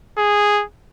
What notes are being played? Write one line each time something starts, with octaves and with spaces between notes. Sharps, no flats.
G#4